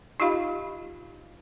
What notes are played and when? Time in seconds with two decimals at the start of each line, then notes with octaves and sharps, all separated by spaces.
0.20 D#4 F4 G4 D#5 F5 B5